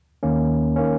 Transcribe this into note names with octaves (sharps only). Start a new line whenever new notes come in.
D#2 D#3 A#3 C#4
D#3 A#3 C#4